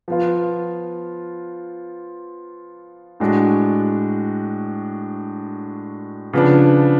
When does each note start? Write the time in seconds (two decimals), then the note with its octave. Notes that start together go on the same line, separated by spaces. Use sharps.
0.08 F3 B3 F4
3.20 A2 G#3 D4 F#4
6.33 C#3 F3 B3 D4